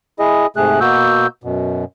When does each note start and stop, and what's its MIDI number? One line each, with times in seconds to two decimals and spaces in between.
0.19 0.47 64
0.19 0.47 68
0.19 0.47 75
0.56 0.80 44
0.56 0.80 48
0.56 0.80 57
0.56 0.80 68
0.56 0.80 90
0.81 1.27 47
0.81 1.27 58
0.81 1.27 59
0.81 1.27 66
0.81 1.27 88
0.81 1.27 91
1.44 1.85 42
1.44 1.85 47